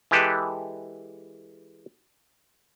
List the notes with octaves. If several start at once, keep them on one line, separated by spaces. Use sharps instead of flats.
E3 G#3 G4 A4 B4